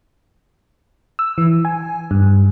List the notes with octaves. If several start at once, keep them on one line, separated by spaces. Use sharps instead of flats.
E6
E3
G#5
G2